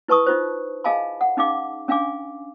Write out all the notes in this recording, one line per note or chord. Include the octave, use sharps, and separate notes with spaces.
E4 B4 A5 C#6 D#6
D#4 F4 C5
G#4 D#5 F5 G#5 A5 B5
F#5
C#4 D#4 G#4 F5 D6
C#4 D4 F5 G#5 D6